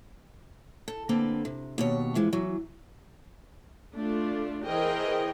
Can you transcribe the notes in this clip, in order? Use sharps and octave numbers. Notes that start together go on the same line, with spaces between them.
A4
D3 A#3 C4 A4 B4
C3
D#2 B2 C#5
E3 F3 G#3
E3 F#3
A3 D4 F4
E3 G#4 A#4 C5 D#5 G5